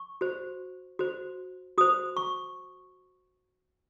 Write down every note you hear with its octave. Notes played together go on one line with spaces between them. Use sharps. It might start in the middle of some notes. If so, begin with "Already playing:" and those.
Already playing: C#6
F#4 C5
F#4 C5
F#4 C5 D#6
C#6